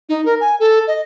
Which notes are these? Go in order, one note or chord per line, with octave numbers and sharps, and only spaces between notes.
D#4
A#4
G#5
A4
D#5